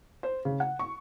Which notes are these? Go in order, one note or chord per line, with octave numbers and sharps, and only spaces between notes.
C5
C#3
F#5
C#6